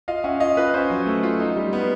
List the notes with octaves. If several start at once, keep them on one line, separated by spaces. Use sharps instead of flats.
F4 D#5 F5
C#4 E5 F#5
F4 D#5 F5
F4 B4
C#4 C5
F#3
A3
F4
D#4
G3
B3